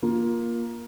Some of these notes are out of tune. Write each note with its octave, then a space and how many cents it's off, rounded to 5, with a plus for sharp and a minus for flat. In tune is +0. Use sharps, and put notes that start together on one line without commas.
A#3 +15 F4 +0